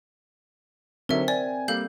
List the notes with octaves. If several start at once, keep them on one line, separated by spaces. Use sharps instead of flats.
D3 F#3 C4 D#4 A#4 E5
D5 G#5
G3 A#3 A4 F5 G6